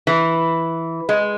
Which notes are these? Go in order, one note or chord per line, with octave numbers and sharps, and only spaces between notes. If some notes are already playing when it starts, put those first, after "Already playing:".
E3
G#3